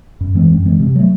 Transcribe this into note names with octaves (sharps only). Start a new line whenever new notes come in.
F#2
E3 G#3 C4
F#2
E3 G#3 C4
C3
F#3 A3